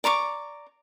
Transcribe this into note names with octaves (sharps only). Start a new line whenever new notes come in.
D5 A#5 C#6 D6